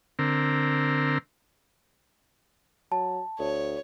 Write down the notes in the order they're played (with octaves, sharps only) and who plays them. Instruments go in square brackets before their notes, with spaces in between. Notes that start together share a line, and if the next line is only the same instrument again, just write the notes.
[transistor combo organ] D3 C4 A#4
[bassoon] F#3 [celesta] A5
[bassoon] D2 [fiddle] C#5